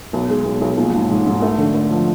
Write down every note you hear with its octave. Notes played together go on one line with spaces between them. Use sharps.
B1
G#3
B1
B1
A#1
G#2
G#2
G#2
A3
D3
A3
F3